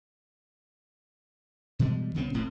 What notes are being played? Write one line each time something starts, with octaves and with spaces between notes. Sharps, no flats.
B2 E3 G3 G#3
C2 C#3 B3 C4
F1 A2 C4